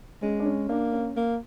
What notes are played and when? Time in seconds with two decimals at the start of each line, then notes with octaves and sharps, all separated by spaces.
0.22 G#3 C#4
0.40 D4
0.45 C#4
0.69 A#3 D4
0.93 C#4
1.16 A#3